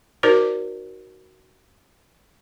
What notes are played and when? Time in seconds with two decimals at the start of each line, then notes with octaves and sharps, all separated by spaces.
0.23 D#4 F#4 A#4 C5 D5